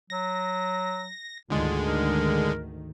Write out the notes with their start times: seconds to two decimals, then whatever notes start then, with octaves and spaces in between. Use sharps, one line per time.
0.10 F#3 A#6
1.50 D2 G#2 D3 D#3 G#3 F4
1.86 A#4